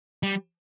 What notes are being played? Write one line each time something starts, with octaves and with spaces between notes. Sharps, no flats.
G3